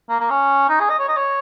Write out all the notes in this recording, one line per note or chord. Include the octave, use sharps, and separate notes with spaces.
A#3
A#3
C#4
D#4
G#4
D#5
C#5
D#5
C#5